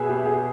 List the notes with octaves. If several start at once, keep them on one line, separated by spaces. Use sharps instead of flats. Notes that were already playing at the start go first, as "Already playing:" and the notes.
Already playing: B2 G#4 B4 E5
G4
G#4